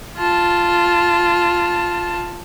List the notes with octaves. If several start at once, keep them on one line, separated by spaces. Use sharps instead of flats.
F4 A5